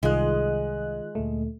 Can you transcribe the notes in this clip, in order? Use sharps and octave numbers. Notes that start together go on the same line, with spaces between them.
C2 D#3 G#3 F4 D#5 F#6
D2 A#2 A3